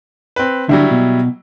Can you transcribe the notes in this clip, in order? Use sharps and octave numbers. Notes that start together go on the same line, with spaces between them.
C4 B4
D3 F#3 G3 E4
B2